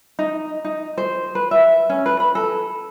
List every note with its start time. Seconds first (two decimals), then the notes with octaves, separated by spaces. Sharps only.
0.19 D#4
0.65 D#4
0.98 C5
1.35 B4
1.51 E5
1.89 C#4
2.06 B4
2.20 B5
2.35 A4